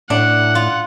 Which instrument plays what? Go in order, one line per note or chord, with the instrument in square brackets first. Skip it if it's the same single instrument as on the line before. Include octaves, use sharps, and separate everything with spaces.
[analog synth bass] A2 [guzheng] D4 [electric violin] F#5
[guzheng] F4